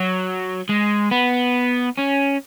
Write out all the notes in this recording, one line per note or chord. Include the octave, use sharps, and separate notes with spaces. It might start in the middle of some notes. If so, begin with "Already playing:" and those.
Already playing: F#3
G#3
B3
C#4